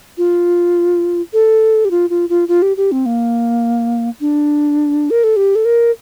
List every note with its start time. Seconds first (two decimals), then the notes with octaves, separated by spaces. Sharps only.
0.18 F4
1.33 A4
1.85 G4
1.91 F4
2.10 F4
2.29 F4
2.48 F4
2.62 G4
2.77 G4
2.92 C4
3.06 A#3
4.21 D4
5.10 A#4
5.24 A4
5.36 G4
5.55 A4
5.65 A#4